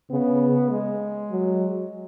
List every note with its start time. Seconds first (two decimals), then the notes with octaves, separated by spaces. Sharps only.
0.10 C#3 B3
0.70 G#3
1.31 F#3